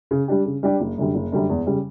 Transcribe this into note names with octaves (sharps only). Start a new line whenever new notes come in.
C#3
G3 D4 G4
C#3
G3 D4 G4
F#1
F#2 D3 G3
F#1
F#2 D3 G3
E2
C#3 G3